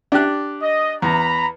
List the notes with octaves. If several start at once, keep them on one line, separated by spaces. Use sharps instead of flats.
D4 G4 F#6
D#5
E2 A#5 B5